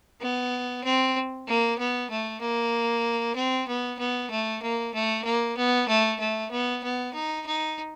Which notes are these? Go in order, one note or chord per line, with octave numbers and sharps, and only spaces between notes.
B3
C4
A#3
B3
A3
A#3
C4
B3
B3
A3
A#3
A3
A#3
B3
A3
A3
B3
B3
D#4
D#4